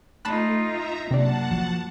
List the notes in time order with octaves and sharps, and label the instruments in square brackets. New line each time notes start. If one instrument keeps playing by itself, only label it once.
[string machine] A3 [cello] D#4 F4 [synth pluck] A5 B5 F#6
[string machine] E5 A#5
[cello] F#2 A#3 [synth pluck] C3 D4 [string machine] F#5 A5
[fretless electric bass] F3 F#3